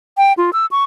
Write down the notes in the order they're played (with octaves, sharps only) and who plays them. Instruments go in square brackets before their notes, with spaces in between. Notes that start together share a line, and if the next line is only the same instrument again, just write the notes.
[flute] G5
F4
E6
C#6